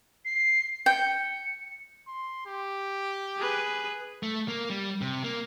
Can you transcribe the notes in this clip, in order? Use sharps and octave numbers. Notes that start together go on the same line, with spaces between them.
C7
G5 C#7
C6
G4
G#4 B4
A3
A#3
G3
C3
A#3